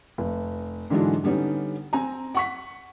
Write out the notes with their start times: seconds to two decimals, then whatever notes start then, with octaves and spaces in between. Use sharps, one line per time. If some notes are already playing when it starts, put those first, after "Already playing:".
0.18 F1
0.90 G#2 D3 E3 F#3 G#3 D4
1.24 D3 G3 B3 C#4 D#4
1.93 C4 G#5 A#5
2.35 F#5 C#6 B6